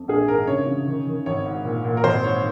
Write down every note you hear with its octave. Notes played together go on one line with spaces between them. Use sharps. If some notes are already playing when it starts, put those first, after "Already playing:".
Already playing: F2
A#1 G#4
G#2 A#4
C#3 C#5
C#3
D#3
D#3
G#1 C#5
G#2
A#2
A#2
A#4
G#1 C5
G#2 C#5